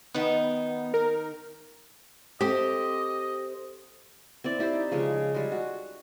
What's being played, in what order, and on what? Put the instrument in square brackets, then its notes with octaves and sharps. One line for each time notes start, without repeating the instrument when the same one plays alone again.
[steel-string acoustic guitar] D#3 D#4 [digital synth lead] B3
[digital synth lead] A#4
[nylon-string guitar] C4 A4 C5 [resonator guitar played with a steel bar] G4 [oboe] D#5
[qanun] C4 E4 D5
C4 E4 G4 C5
D#4
C#3 F3 G#3
G3 G#3
F#4